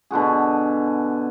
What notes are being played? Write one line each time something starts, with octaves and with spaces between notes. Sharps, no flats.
B2 D3 F#4 G#4